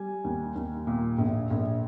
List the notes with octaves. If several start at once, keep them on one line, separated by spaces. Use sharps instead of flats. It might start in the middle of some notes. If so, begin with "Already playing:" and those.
Already playing: G3 G#5
D#2
D#2
A#2
A#1
A#1